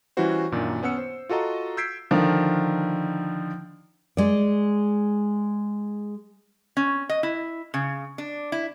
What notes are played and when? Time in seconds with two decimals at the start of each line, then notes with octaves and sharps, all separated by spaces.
0.17 E3 G3 C#4 E4 F#4 C5
0.52 F#2 A#2 D#3 D4
0.83 B3 C#4 F#5 E6 C#7
0.98 C5
1.29 F4 F#4 A4 D#5 A#5
1.77 E6 G6 G#6 B6 C7 D7
2.11 D3 D#3 F3
4.17 G#3 D5
6.77 C#4
7.09 D#5
7.23 E4
7.74 C#3
8.18 D4
8.52 E4